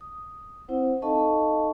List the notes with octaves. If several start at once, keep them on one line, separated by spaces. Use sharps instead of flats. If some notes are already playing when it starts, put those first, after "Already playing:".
D#6
C4 E4 C5 F#5
D#4 A4 D#5 F5 A5 C#6